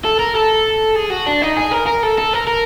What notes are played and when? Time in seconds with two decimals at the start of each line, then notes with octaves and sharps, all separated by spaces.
0.05 A4
0.19 A#4
0.35 A4
0.96 G#4
1.10 F#4
1.27 D4
1.42 D#4
1.57 G#4
1.71 A#4
1.87 A#4
2.03 A4
2.18 A4
2.33 A#4
2.47 A#4